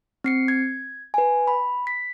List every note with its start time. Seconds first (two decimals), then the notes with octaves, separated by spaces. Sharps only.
0.24 C4 C7 C#7
0.48 G#6
1.14 B4 G#5
1.48 B5
1.87 B6